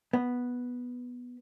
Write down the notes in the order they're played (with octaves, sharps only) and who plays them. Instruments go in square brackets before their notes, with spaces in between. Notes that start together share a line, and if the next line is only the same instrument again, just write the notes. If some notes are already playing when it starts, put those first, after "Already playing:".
[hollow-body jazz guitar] B3